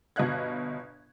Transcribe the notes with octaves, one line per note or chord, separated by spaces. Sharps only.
G1 B2 D#5 F5 F#6 G#6